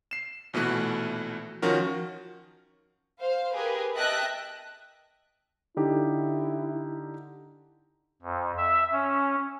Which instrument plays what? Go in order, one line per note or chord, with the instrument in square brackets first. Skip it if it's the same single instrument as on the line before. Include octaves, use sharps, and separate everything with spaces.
[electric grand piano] C7 E7
A#1 B2 E3 A3 F#6
D#3 F3 C#4 F#4 A#4
[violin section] C5 F5
G4 G#4 A#4 B4
D#5 E5 G5 A5 F#6
[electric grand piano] D3 D#4 G4 [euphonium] E4
[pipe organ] F2
E5
C#4